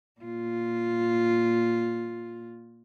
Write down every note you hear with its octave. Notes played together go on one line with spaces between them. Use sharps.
A#2 F4